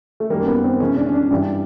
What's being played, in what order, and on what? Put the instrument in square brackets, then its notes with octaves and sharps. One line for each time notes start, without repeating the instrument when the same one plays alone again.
[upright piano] A3
F#2 D#3 G3 A#3
B3
C4
C3 E3 G#3 C#4
D4
C#4
D4
G2 E3 G3 D4